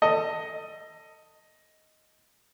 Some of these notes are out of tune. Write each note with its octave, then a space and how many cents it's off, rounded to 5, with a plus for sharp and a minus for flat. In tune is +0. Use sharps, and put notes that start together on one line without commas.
A4 +25 D#5 +10